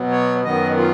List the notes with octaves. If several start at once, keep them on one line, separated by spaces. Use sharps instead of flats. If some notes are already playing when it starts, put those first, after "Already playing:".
Already playing: B2 F#3 B3
C#5
F#2 D#3 F#3 B3 D#5
F4